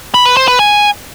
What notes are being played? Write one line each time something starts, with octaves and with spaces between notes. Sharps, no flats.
B5
B4
C5
B4
G#5